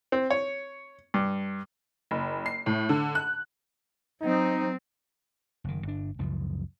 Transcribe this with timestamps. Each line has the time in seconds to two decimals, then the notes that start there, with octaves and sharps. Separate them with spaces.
0.12 C4
0.31 C#5
1.14 G2
2.11 F#1
2.46 C7
2.66 A2
2.89 D3
3.15 F#6
4.22 F#3 C4 D#4
5.64 F#1 D#3
5.83 G1 D4
6.19 C#2 F#2 C#3 F3